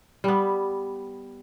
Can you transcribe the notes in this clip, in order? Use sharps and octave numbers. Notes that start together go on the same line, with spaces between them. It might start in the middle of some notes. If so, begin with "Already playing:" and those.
G3 B3